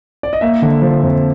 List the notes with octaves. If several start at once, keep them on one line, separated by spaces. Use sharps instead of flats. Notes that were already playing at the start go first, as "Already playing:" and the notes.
D5
D#5
A#3 E5
D3
F3
F2